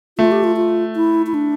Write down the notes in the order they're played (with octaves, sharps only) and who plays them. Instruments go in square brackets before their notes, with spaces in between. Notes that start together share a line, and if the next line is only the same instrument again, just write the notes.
[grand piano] A3 [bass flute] F4
[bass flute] G4
F4
F4
E4
E4
D4